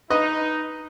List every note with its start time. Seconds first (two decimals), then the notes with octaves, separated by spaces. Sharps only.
0.10 D#4 B4 D#5